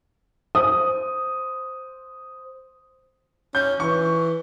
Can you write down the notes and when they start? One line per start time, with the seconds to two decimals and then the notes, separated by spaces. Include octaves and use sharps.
0.55 C5 D#6
3.55 C#4 G6
3.80 E3 C#6